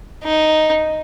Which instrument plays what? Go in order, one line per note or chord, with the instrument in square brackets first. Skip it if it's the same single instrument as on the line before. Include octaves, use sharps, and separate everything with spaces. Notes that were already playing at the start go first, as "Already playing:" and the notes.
[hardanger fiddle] D#4